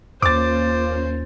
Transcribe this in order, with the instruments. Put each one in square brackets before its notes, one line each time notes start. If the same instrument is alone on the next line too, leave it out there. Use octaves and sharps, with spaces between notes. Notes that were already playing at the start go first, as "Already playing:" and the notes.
[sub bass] D#2 [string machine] A#3 C#4 F4 [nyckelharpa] C5 [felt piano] D6 A6